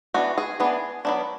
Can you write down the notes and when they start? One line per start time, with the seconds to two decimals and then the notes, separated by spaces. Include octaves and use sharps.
0.14 E3 B3 D4 F#4
0.38 G#4
0.60 E3 B3 D4 G#4
1.05 F#3 B3 D4